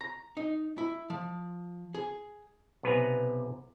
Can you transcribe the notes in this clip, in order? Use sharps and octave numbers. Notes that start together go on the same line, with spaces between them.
A#5
D#4
E4
F3
G#4
B1 C3 B3 B4 G#5 A#5